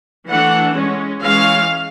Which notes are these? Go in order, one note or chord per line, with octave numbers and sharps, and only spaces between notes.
E3 A3 D4 F#5
G#3 C#4
E3 G#3 C#4 F5